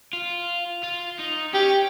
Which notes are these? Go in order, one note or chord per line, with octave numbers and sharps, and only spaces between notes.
F4
F4
D#4
C#4 G4